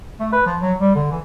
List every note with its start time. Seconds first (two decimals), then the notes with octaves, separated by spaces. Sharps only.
0.20 A3
0.33 B4
0.46 F3
0.62 F#3
0.79 G3
0.95 D3
1.11 E3